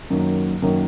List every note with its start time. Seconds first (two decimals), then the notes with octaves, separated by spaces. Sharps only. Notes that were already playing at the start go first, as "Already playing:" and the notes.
0.10 F#2 D#3 F#3 A#3
0.62 F#2 D#3 F#3 A#3